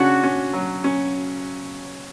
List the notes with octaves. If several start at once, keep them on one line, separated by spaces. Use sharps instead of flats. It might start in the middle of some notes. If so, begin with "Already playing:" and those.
Already playing: C#3 C#4 D4 F#4
C#4
F#3
C#4